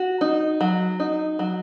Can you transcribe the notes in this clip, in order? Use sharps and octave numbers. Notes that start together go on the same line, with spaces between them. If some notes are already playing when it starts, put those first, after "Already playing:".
Already playing: F#4
D#4
F#3
D#4
F#3